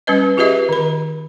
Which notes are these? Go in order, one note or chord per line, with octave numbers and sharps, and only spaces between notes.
G3 C#4 B4 D#5
F4 G4 G#4 B4 D#5 E5
D#3 B5